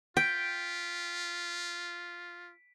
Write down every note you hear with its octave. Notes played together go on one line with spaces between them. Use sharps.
F4 G5 B6 D7